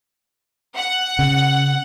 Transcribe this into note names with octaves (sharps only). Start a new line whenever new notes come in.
F#5
C#3